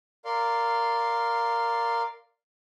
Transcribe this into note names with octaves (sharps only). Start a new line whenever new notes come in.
A#4 D5 F5 C6